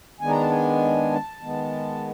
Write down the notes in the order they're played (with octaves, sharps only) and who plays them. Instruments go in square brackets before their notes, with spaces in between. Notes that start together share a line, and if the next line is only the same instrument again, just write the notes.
[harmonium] D#3 G#3 B3 D4 G#5
A#5
A5
G#5
A5
D#3 G#3 B3